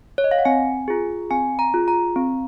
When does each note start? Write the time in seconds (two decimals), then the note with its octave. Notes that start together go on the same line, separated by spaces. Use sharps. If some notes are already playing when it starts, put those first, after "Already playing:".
0.18 C#5
0.24 D#5
0.31 F5
0.38 F#5
0.45 C4 G#5
0.88 F4 G#4
1.31 C4 G#5
1.59 A#5
1.74 F4 G#4
1.88 A#5
2.16 C4